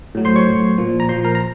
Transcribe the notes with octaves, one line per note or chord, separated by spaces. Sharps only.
A2 F#3
C5 C6
C#5 C#6
A2 F#3
A#2 F3
A#5
A#2 F3 C5 C6
A#4 A#5
A#5